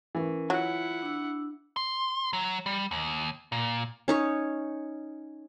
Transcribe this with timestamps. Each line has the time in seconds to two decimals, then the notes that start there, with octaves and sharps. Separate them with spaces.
0.15 E3 C#4 A#4 C#6
0.50 F#3 E4 F4 F#5
1.02 D4 E6
1.76 C6
2.33 F#3
2.66 G3
2.91 D#2
3.52 A#2
4.08 C#4 D#4 C#5